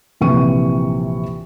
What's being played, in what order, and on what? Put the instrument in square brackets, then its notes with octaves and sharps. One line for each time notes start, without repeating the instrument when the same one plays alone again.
[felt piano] A#1 C3 E3 C#6 D#7